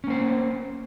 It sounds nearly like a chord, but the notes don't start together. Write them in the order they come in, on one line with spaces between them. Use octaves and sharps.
C#4 A#3 C5